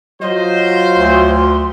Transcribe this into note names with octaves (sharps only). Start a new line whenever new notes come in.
F#3 F4 C5 D#5
D2 C6